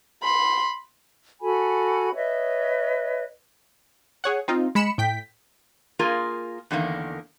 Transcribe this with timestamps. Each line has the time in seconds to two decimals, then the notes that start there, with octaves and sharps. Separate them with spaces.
0.23 B5 C6
1.41 F#4 A4 G#5 B5
2.15 B4 C#5 D#5 E5
4.24 G#4 C#5 F#5
4.48 C4 D#4 F4
4.75 G#3 B5 C#7 E7
4.98 A2 G5 B6
5.99 A#3 F4 G#4 A#4
6.71 E2 D3 D#3 A#3